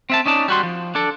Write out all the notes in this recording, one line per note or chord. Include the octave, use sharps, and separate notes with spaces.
C4 E5 A5
C#4 D#4 D5 A5
G3 F#4 C6
F3
D4 A4